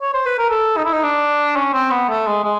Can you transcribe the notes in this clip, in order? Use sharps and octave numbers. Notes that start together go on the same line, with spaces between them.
C#5
C5
B4
A#4
A4
D#4
E4
D#4
D4
C#4
C4
B3
A3
G#3
G#3